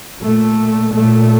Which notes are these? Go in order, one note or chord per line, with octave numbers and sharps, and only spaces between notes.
A#2 A3
A#2 A3